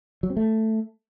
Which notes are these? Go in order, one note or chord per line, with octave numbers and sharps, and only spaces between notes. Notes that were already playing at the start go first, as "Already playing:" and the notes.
F#3
C4
A3